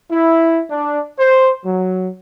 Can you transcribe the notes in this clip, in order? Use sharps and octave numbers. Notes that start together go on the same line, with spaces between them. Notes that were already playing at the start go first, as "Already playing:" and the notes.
E4
D4
C5
F#3